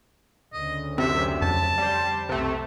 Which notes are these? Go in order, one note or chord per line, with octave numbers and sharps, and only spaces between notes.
D2 C#3 D#5
F#2 C3 C4 E5
F2 A5
G3 C5
B1 C3 A3